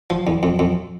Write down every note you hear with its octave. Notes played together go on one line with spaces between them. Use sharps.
F3
E2
F2
F2